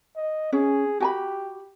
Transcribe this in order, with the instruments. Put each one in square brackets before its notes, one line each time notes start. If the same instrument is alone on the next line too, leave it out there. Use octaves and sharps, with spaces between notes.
[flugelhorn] D#5
[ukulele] C#4 [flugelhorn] G#4
[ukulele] F#4 G#5 B5 [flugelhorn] G4